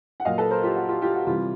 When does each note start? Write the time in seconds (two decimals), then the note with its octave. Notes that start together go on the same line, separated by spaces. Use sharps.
0.20 F#5
0.25 A#2 F#3 D#5 F5
0.38 A4 B4
0.51 A#4 C5
0.63 F4 G4
0.76 F#4
0.89 F4 G4
1.02 F4 G4
1.14 F#4
1.27 C3 E3 G3 F4